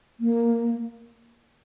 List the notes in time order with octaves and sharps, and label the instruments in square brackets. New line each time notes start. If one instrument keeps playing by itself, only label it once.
[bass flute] A#3